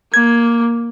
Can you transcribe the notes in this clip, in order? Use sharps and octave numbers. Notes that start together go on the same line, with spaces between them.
A#3 G#6